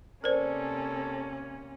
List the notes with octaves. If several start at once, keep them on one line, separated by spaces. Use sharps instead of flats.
C3 A#3 C#4 A4 A#4 C5 D5